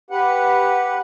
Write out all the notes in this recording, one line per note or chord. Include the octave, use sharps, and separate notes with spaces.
G4 B4 F#5